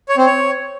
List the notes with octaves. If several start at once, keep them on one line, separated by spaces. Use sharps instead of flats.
C#5
C4
C#5